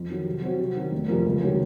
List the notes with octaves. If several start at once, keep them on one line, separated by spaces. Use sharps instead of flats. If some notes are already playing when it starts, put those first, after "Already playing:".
Already playing: F2
D#3 F#3
C3
F#3 C4 F#4
C3
D#3 F#3 C4
F1
F2 C3 F3 A#3
C#2
C3 D#3 F#3 C#4